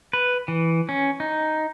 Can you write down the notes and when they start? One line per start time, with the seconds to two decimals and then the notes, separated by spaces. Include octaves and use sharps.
0.13 B4
0.48 E3
0.89 C#4
1.20 D#4